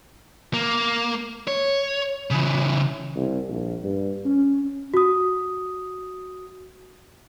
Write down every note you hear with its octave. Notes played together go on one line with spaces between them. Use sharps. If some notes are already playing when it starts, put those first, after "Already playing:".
A#3
C#5
C#3 E3
C2
A#1
G2
C#4
F#4 D#6